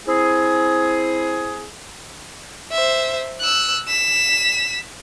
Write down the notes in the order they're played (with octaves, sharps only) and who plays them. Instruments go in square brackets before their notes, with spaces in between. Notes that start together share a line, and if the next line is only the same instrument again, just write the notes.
[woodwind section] C4 E4 G#4
[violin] C5 E5
E6 F#6
B6 E7